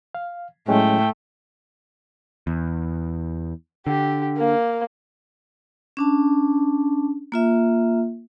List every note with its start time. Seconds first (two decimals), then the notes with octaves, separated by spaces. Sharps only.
0.15 F5
0.68 A2 F#3 G#3 A3 C#4 G5
2.47 E2
3.87 D3 G4
4.38 A#3
5.97 C#4 D4 A5
7.32 A#3 F4 E5